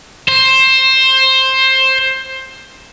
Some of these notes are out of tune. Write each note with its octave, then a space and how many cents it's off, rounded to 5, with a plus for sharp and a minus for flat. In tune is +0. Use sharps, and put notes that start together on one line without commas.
C5 +15